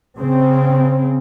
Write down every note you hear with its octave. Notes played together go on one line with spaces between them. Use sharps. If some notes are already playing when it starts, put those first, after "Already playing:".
C#3 C4